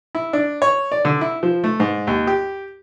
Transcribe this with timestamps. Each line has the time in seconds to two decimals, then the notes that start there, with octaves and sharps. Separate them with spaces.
0.15 E4
0.33 D4
0.62 C#5
0.92 D5
1.05 D3
1.21 E4
1.43 F3
1.64 A3
1.80 G#2
2.07 D#2
2.27 G4